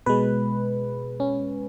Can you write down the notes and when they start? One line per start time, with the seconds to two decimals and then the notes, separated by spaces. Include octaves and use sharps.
0.06 B2 G#3 B4
1.20 C#4